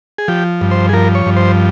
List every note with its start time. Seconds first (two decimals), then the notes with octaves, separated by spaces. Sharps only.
0.18 G#4
0.28 F3 G4
0.61 G2
0.71 C5
0.89 G#4
0.93 F3 A#4
1.15 C#5
1.26 G2
1.36 C5